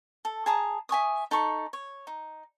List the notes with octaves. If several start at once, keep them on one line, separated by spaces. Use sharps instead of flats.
A4
G#4 A5 A#5 D#6
E5 G#5 C#6 D#6
D#4 A4 B5 C#6
C#5
D#4